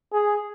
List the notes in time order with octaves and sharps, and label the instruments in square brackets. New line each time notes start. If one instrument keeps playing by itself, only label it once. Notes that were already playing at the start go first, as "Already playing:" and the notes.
[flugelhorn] G#4